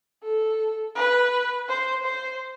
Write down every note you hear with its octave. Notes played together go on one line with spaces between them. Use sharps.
A4
B4
C5
C5